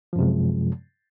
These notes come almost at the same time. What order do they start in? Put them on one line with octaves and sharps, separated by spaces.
F3 F#2 C3 G#3